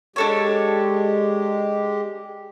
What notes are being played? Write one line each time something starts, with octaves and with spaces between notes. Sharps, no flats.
G#3 D4 G4 A4 C#5